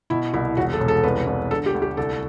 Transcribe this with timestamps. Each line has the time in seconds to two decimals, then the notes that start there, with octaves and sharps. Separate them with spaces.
0.10 B2 E4
0.34 C2 E4
0.57 E1 F#4
0.73 A4
0.80 E1
0.88 A4
1.04 C2 B4
1.27 C2
1.51 D3 A4
1.66 G4
1.74 D2
1.82 G4
1.97 C2 A4